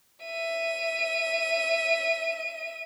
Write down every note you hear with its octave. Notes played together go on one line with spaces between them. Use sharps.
E5 D#7